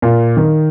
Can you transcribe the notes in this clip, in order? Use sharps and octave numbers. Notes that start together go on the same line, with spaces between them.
A#2
D#3